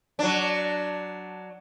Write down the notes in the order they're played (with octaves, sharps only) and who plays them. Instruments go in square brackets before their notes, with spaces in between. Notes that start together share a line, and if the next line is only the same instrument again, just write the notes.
[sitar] F#3 D4